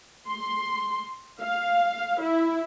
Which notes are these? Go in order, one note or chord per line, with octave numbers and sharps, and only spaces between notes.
C6
F5
E4